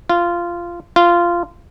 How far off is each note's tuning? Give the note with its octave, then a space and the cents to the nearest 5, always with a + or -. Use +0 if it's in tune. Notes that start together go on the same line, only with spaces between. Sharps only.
F4 -15
F4 -15